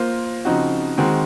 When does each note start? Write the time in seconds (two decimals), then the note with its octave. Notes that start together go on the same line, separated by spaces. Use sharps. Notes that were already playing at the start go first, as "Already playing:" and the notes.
Already playing: A#3 F4 C5
0.45 C#3 F3 C4 D#4 F#4
0.97 D#3 G#3 C4 F#4